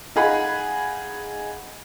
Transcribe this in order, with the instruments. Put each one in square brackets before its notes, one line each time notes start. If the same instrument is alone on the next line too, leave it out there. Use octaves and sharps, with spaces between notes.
[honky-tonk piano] D#4 F4 G#4 F#5 B5